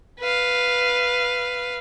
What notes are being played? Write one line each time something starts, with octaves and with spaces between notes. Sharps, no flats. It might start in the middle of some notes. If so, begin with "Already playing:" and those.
B4 F5